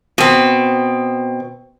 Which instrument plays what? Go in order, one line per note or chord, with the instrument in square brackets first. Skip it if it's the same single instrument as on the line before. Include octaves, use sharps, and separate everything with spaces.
[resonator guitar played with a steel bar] B2 C4